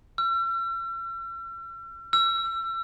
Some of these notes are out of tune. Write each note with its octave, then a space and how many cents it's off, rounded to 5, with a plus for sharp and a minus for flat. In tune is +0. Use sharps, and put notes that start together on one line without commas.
E6 +45
E6 +35